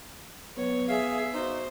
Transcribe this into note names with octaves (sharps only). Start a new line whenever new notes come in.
F#3 B3 C#5
G#4 E5 F5
D#4 F#4 C5